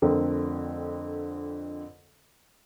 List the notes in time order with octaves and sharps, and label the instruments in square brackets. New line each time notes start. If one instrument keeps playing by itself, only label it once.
[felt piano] F2 D3 A3 C4 A#4